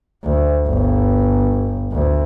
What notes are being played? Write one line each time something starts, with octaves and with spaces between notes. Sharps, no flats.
D2
G1
D2